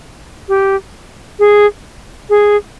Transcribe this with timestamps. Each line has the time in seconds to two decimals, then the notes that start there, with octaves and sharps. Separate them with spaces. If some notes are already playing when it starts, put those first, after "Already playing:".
0.48 G4
1.39 G#4
2.29 G#4